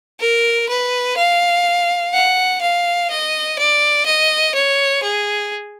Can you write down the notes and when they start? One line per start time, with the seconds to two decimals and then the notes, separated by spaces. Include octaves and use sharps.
0.20 A#4
0.69 B4
1.17 F5
2.13 F#5
2.61 F5
3.10 D#5
3.59 D5
4.06 D#5
4.55 C#5
5.03 G#4